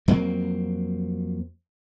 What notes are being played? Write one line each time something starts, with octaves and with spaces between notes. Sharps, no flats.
F2 F#3 A#3 C4